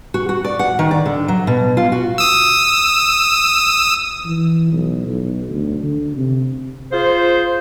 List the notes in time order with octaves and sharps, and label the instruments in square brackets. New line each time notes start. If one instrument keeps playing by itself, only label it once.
[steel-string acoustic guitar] F#4
F#4
D5
F#5
D#3
D5
D3
F#3
B2
F4
F#4
[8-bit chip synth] D#6 E6
[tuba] E3
B1
B1
D2
D3
C3
[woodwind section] F4 G#4 C5